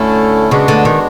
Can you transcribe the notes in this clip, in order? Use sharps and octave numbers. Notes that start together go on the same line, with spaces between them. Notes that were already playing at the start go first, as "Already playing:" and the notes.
Already playing: D2 D3 A3 C#4 E4 A4
C#3 G#3 B3 D4 F#4
D2 D3
D#3